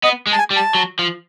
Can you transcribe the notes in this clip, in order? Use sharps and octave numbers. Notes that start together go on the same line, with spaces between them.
B3 D#5
G#3
A5
G#5
G3
A5
F#3
F3